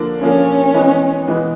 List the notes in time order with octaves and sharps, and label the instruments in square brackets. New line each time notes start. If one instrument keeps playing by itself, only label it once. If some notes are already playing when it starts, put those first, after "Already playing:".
Already playing: [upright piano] D3 F3 A#3 D4
[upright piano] D3 F3 A#3 D4 [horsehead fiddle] C#4
[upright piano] E3 G#3 B3
E3 G#3 B3